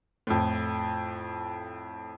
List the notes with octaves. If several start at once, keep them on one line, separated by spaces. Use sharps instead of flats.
F2 A2